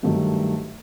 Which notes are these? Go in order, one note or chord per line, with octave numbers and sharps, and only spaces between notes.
G2 D#3 F#3 A3